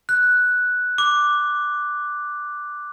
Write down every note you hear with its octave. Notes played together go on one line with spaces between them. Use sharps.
F#6
D6